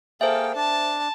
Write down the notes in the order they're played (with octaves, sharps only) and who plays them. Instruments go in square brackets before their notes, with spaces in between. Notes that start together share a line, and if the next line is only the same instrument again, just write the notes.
[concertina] A#3 G#4 G5 [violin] A4 [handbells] C5 E5
[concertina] D4 [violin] A5